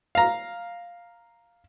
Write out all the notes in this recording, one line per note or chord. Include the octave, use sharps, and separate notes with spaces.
F5 A#5